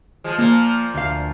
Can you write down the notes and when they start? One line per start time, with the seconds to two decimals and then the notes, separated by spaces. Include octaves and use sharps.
0.24 F3 G#3
0.39 A#2 F3 A#3
0.94 D2 F5